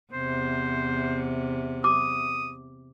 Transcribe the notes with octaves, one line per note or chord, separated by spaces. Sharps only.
E2 C3 C5
D6 D#6